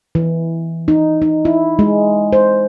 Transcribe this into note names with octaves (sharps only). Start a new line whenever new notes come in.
E3
D#4
D#4
E4
G#3
C5